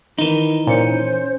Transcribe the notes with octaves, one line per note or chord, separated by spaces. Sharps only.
D#3 E3 D#4
A#2 C#4 C5 C#7